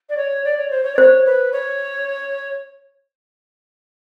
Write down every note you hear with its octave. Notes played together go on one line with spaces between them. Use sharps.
D5
C#5
D5
C#5
C5
C#5
D5
C5 C#5
B4
C#5